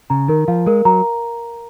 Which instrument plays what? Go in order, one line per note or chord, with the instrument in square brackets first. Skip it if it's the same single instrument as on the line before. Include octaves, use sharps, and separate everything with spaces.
[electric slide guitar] C#3 [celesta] A#5
[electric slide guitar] D#3 [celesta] A#4
[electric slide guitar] F3 [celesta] F5
[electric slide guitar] G#3 [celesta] A#4
[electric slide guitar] F#3 [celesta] A#5